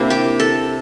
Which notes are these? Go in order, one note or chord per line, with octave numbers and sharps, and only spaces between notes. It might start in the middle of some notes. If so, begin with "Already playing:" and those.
Already playing: C3 A#3 D4 E4
G4
A4